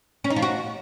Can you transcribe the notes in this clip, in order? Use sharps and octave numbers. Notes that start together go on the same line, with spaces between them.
C#4
D#4
F3
F#4